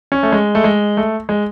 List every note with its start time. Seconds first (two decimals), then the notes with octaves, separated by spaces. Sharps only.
0.12 C#4
0.23 A3
0.32 G#3
0.55 A3
0.64 G#3
0.97 A3
1.29 G#3